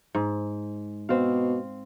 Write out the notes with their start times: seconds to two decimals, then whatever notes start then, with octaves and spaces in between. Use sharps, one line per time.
0.15 G#2
1.09 B2 C4 F5